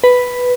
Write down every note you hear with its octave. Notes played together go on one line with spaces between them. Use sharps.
B4